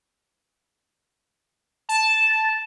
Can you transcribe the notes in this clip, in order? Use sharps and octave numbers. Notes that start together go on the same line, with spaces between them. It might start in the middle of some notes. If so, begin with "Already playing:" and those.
A5